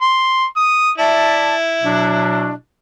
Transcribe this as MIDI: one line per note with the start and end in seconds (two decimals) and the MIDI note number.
0.01 0.46 84
0.56 0.90 87
0.98 2.51 64
0.98 1.54 74
0.98 1.54 76
0.98 1.54 81
1.82 2.52 47
1.82 2.52 54
1.82 2.52 62